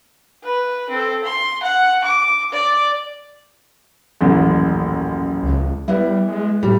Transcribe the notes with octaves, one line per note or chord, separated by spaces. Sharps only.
B4
C4 A4
C6
F#5
D6
D5
D#1 A1 F#2
C#2
G3 B3 E4
G#3
A2 G3